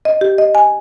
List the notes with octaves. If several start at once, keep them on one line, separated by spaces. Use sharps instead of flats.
D#5
G4
D#5
G#5